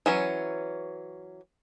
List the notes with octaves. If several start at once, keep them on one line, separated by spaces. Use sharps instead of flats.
E3 F#3 C#4